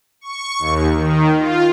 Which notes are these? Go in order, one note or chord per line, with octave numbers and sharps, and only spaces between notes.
C#6
D#2
D#3
F4